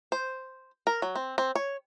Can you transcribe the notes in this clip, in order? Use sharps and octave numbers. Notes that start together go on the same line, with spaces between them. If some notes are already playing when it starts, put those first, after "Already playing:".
C5
A#4
F#3
C4
C4
C#5